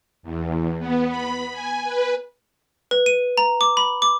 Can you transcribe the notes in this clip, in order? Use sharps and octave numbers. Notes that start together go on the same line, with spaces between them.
E2
B3
B5
G#5
B4
B4
D#7
A#5
D6
B5
D6